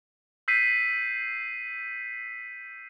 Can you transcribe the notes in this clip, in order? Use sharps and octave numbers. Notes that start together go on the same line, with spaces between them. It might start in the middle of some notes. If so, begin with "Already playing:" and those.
E6 G6 B6 C7 D#7